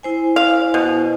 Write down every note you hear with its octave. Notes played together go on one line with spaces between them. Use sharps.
E4 C5 G#5
F5
B2